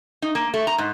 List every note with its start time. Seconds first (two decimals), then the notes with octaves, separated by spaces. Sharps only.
0.22 D#4
0.35 A#3
0.54 A3
0.67 A#5
0.78 G#2